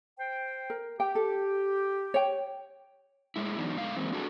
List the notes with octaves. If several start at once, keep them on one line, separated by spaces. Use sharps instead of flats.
C5 G5
A#4
G4 G5
A4
C#5 G5
A2 G#3 E4
E3 F#3 B3 D4 D#4
A#2 D3 G#3 A3 F5
E3 G#3 A#3 C4
D4 F#4 G#4 A4